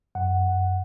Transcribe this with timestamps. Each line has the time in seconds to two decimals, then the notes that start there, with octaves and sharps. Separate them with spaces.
0.15 F#2 F#5